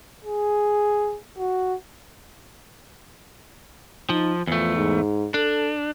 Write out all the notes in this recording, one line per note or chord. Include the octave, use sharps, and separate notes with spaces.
G#4
F#4
F3 D#4
E2 F3 A3
G#2
D4 A4